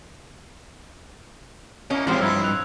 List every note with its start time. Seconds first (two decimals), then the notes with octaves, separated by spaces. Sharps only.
1.90 A#3 C#4 E4 D#5
2.07 A2 E3 F3 G#3 C4 F#4 G4
2.21 G2 D#4 E4 E6 G#6
2.44 F#6 F7